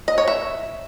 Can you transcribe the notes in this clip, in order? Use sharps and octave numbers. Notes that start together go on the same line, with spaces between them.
D#5
C#5
E5